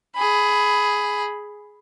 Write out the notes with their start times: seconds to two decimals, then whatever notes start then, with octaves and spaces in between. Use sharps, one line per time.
0.16 G#4 B5